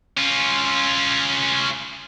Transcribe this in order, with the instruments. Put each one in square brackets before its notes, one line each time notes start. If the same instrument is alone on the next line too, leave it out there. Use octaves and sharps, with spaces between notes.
[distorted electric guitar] C#4 F4